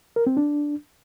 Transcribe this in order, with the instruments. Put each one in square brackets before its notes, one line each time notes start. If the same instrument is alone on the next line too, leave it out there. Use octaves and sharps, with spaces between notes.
[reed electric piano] A#4
C4
D4